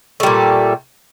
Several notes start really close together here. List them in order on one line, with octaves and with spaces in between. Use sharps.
A3 G3 A#2